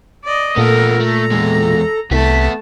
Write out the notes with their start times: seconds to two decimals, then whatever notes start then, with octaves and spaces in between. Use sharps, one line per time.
0.24 D5 D#5
0.58 A#2 A3 B3 A4 A#4
1.00 A3 A#5
1.32 E2 G#3
2.11 C2 A3 B3 E5 A5 B6